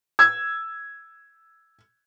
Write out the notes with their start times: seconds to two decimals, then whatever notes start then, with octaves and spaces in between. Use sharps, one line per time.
0.19 E6 G#6